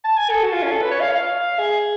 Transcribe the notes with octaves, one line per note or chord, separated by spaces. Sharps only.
A5
G#5
A4
F#4
F4
C#4
A4
B4
C#5
F5
F5
G#4